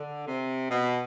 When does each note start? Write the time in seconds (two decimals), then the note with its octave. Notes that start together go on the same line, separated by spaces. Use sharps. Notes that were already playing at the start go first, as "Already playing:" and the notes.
Already playing: D3
0.26 C3
0.70 B2